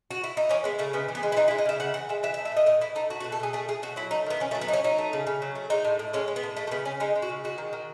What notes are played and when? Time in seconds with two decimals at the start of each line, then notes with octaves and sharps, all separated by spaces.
0.11 F#4
0.24 E4
0.37 D#4
0.49 E3 C#4
0.64 G#3 B3
0.79 C#3 A3
0.93 C#3 B3
1.08 E3
1.15 B3
1.23 G#3
1.32 E4
1.36 E3 D#4
1.48 E4
1.51 G#3
1.58 D#5
1.65 C#3 E5
1.80 C#3 F#5
1.94 E3 F#5
2.09 G#3 E5
2.23 E3 E5
2.34 E5
2.39 A3
2.45 E5
2.52 A2 D#5
2.66 A2 D#5
2.81 E3 E4
2.95 A3 D#4
3.10 A3 F#4
3.20 F#4
3.24 B2
3.32 A4
3.40 B2 G#4
3.53 A3 G#4
3.68 A3 G#4
3.82 B2 F#4
3.96 F#3 E4
4.11 A3 D#4
4.26 D#3 B3
4.40 D#3 C#4
4.51 A3
4.55 F#3
4.61 B3
4.68 A3 D#4
4.73 C#4
4.84 F#3 D#4
4.98 A3
5.13 C#3
5.27 C#3
5.42 F#3
5.55 A3
5.70 G#3 D#4
5.85 A2
5.99 A2
6.13 G#3 C#4
6.28 G#3
6.36 B3
6.43 A2
6.57 G#3 A3
6.67 A3
6.71 C#3 B3
6.85 C#3 C#4
7.00 G#3 D#4
7.16 G#3
7.22 F#4
7.30 C#3
7.44 G#3 F#4
7.58 D#3
7.73 D#3